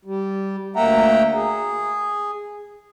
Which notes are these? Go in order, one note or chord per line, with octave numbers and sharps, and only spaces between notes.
G3
D2 A#3 E5 F#5 G5 A#5
G#4